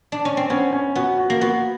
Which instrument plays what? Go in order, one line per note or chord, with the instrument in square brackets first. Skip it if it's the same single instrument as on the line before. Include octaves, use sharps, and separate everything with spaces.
[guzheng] D4
C#4
C4
[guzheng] B3 [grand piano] C#4
[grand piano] C#4
[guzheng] B3 [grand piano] F#4
[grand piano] F#4
[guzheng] A#3
[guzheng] B3 [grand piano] F#4